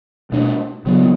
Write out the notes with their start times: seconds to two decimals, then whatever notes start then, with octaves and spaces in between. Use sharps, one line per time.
0.32 B2 A3 D4
0.86 C#3 F#3 B3